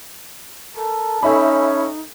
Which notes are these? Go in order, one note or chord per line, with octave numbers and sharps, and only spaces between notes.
A4 A#4 A5
C#4 D#4 A4 E5 B5